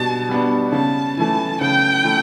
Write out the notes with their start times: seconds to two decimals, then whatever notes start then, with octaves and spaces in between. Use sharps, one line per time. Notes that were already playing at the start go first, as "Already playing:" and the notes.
Already playing: B2 G3 B3 D4 A5
0.29 G3 B3 D4
0.72 C#3 A5
1.17 E3 A3 E4 A5
1.61 C#3 G5
2.04 E3 A3 E4